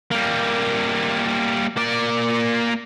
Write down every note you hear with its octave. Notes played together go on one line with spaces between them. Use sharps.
G3 A#3
A#3 D5